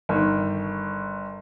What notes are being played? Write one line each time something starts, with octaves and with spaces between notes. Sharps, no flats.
G1 D#3